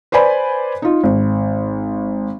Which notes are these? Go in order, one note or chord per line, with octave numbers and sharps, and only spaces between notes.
B4 C5 D5 G#5 B5
D#4 F4
G#1